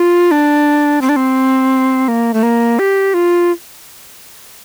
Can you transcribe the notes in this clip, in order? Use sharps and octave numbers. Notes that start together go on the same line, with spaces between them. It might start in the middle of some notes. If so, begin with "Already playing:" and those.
Already playing: F4
D4
C4
D4
C4
A#3
A3
A#3
G4
F4